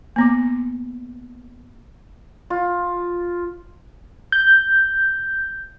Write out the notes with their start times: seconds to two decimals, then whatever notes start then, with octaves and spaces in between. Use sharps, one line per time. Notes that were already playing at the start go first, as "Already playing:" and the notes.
0.16 A#3 B3 D6
2.50 F4
4.32 G6